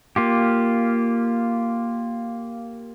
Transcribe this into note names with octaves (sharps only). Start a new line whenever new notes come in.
A#3 F4 G4